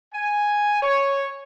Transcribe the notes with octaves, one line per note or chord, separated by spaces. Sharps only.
G#5
C#5